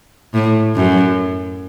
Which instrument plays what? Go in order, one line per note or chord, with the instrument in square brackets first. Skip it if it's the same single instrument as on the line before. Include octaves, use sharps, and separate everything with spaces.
[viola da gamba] A2
F#2